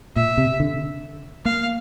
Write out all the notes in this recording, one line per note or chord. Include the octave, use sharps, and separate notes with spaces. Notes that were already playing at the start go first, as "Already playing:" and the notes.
A#2 E5
C3
D3
A#3 F5